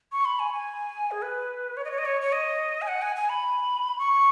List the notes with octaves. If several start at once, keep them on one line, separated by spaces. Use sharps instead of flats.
C#6
B5
G#5
G#5
G#4
B4
C#5
D#5
C#5
D#5
C#5
C#5
D#5
G#5
F#5
G#5
G#5
B5
C#6